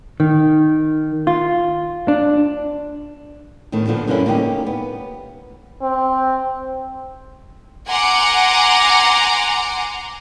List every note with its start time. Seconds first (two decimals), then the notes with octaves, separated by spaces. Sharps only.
0.20 D#3
1.27 F4
2.08 D4
3.72 E2 A2 D#3
3.87 A#2 D3 F3 B3
4.07 G2 A#2 D3 A#3 C#4 E4
4.26 A#3 C#4 D#4 F#4 G4
4.66 B3
5.81 C4
7.87 F#5 G#5 A#5 C6 D6